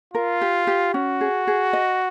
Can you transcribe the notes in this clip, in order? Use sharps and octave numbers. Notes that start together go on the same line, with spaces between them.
F4 A#4
G4
G4
C#4 F#4
G#4
G#4
D#5